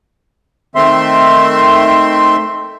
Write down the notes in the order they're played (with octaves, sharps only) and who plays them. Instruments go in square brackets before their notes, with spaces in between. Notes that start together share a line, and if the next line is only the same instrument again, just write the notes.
[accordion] D#3 A3 C4 E5 C6